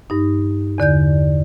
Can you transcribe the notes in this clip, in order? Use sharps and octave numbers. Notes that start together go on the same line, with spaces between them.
G2 D#4
E2 D3 D5 G6